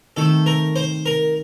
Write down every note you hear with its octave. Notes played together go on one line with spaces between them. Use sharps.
D#3 A3 C4 A4
A#4
C5
A#4